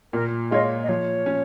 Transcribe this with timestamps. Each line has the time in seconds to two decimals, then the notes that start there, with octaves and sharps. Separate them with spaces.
0.13 A#2 A#4
0.51 G#3 F4 C#5 D#5
0.83 D#5
0.89 F3 C#5
1.26 C#4